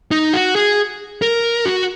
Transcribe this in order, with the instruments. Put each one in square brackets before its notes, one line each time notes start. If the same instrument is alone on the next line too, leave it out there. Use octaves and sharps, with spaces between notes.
[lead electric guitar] D#4
F#4
G#4
A#4
F#4